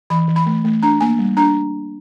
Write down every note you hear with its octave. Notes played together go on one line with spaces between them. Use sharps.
E3 B5
E3
B5
A3
A3
D4 A#5
A#3 G#5
G3
D4 A#5